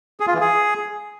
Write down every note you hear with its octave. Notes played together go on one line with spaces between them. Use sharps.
G#4
F4
E3
G#4